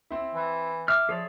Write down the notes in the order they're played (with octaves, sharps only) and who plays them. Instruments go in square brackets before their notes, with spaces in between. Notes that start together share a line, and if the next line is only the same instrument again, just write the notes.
[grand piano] C4 E4
[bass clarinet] E3
[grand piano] E5 [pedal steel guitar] D6 F6
[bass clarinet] F3 [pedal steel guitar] G#4 C#5 D5